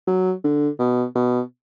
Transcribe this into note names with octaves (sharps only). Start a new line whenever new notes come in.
F#3
D3
B2
B2